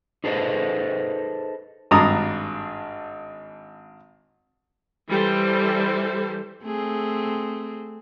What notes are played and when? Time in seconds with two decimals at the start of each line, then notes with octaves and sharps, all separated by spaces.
0.24 D#4 G#4 A4 B4 C5 D#5
1.91 G#1 G2 A#5 D#6
5.08 E3 G3 A4 C5
6.63 A3 C4 G#4